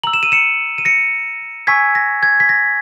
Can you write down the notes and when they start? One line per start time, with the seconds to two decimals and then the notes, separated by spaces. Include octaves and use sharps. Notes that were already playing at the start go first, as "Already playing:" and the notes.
0.03 A#5 E6 F#7
0.13 E7
0.23 D#7
0.32 C#7 E7
0.78 D#7
0.85 A#6 C#7
1.67 G#5 C#6 E6 G#6 B6
1.95 A#6
2.23 G#6
2.40 B6
2.49 A#6